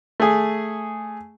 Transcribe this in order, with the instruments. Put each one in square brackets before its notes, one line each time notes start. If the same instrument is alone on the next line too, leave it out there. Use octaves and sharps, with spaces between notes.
[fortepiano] A3 G#4